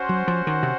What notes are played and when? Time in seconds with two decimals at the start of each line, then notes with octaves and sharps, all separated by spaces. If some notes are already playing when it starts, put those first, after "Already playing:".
Already playing: C#4 F#4 C5 F#5
0.09 F#3
0.28 F3
0.47 D#3
0.63 C3